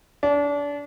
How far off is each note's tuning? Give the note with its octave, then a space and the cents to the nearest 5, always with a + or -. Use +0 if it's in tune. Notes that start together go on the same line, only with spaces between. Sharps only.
D4 -30